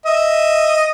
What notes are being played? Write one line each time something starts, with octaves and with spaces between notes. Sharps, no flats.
D#5 E5